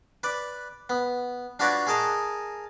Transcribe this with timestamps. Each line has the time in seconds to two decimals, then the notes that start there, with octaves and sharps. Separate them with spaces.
0.23 B4 D5 B5
0.90 B3
1.59 D4 F4 F#4 B4 C#5 D5
1.87 G#4 A#4 D#5 A5 A#5